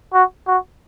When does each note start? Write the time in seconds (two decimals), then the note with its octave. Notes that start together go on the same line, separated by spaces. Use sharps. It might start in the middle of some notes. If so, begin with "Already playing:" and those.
0.13 F#4
0.47 F#4